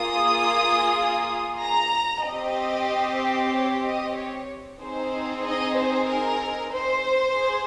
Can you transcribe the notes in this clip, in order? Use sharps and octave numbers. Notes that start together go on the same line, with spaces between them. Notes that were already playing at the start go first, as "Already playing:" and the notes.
Already playing: A#3 F4 G#4 D#6
A#5
C4 G4 D#5
C#5
D#5
C#5
C4 D#4 G#4 C5
D#5
C5
A#4
C5
G#4